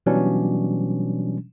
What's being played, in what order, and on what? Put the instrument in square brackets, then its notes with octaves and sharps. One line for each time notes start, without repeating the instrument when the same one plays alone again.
[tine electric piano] B2 E3 F#3 G3 C#4 D4